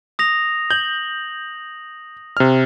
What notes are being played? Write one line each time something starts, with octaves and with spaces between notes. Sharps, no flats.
D#6 A#6 F7
G6 F#7
C3 F6